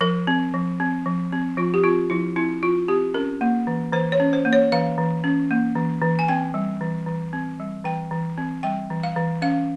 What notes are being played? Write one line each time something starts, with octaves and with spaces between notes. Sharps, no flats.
F3 A#4
C4
F3
C4
F3
C4
F3 F4
G4
C4 F4
F3 E4
C4 E4
F3 F4
C4 G4
C#4 A#4
A#3
E3
E3 C5
C#5
C#4
C5
A#3
C#5
E3 F5
E3
C#4
A#3
E3
E3
G#5
C4 G5
G3
E3
E3
C4
G3
E3 G5
E3
C4
G3 G5
E3
F5
E3
C#4 F5